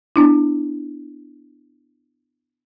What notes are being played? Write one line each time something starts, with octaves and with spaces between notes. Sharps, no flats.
B3 D4 E4